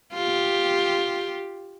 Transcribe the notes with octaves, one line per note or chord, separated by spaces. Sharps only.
F4 G4